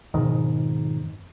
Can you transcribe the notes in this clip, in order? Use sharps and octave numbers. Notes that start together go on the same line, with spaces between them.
F2 G#2 B2 D#3